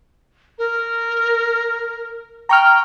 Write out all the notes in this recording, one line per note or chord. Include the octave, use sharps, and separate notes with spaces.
A#4
G5 A#5 C#6 F6